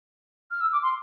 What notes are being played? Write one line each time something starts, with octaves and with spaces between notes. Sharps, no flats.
F6
E6
D6
C6